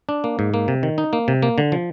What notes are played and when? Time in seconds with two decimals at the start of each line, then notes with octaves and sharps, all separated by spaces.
0.09 D4
0.24 A#3
0.39 G#2
0.54 A#3
0.68 C3
0.83 D#3
0.98 D#4
1.13 A#3
1.28 C3
1.43 A#3
1.58 D3
1.72 F3